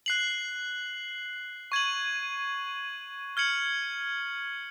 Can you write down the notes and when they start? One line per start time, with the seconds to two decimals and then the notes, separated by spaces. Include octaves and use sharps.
0.06 F#6 C7 F#7
1.72 C#6 G#6 D#7 F#7
3.37 F6 G#6 C#7 F#7